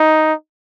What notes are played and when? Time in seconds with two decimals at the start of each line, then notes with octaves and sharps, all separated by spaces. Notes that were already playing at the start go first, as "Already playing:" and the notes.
Already playing: D#4